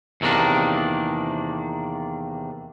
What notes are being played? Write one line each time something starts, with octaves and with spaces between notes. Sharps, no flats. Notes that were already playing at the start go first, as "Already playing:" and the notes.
E2 C3 D#3 A#3 D4